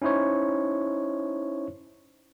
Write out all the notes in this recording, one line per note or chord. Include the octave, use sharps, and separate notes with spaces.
C#4 D#4 E4 C5 C#5